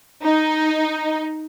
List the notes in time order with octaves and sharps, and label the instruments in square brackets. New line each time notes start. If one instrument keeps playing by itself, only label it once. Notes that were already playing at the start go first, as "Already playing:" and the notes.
[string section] D#4